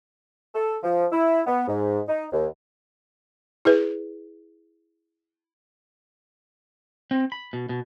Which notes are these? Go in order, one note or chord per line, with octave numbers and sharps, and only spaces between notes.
A4
F3
E4
B3
G#2
D#4
D#2
E4 G#4 B4
C4
B5
B2
B2